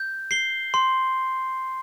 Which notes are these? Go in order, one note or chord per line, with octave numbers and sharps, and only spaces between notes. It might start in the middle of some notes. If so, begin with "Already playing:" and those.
Already playing: G6
C7 G7
C6